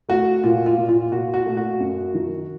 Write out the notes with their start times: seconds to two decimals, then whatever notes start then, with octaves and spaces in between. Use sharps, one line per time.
0.09 A3 F#4
0.44 A#2 F4
0.66 F4
0.78 A#2
0.89 F4
1.11 A#2 F#4
1.34 F#4
1.46 A3
1.57 F#4
1.80 F#2
2.14 D#3